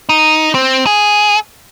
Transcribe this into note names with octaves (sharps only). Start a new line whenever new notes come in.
D#4
C4
G#4